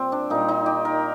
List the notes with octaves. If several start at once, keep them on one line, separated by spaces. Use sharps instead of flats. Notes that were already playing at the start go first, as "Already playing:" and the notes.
Already playing: A#2 G3 C4
D4
A#2 G3 D#4
D#4
G4
A#4